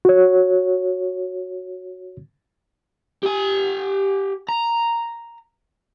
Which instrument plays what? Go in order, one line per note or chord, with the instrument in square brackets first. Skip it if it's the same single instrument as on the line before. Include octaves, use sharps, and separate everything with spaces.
[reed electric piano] F#4 C#5
[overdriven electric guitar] G4 G#5
A#5